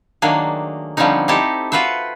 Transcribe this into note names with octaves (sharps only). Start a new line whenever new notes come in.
D#3 F#3 A3 A#3 D4 G#4
D3 F3 G3 C4 C#4 D#4
C4 D#4 E4 G4 A4 D#5
F4 F#4 B4 C5 E5